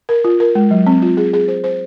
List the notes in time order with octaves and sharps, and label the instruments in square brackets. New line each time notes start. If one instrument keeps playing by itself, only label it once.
[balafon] A#4
F4
A#4
G#3
F#3
C4
F4
G#4
G#4
C5
C5